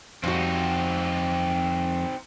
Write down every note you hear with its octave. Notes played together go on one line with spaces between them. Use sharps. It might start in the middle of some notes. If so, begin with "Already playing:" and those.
F2 C4 D#4 F#4